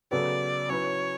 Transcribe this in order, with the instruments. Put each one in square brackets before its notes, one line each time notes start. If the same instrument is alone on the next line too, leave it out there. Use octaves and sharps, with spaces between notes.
[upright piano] C#3 F#3 B3 F#4 A4 [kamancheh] D5
[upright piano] F#3 C#4 E4 B4 [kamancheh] C#5